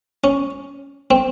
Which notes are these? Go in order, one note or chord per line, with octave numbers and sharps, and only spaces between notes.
C#4
C4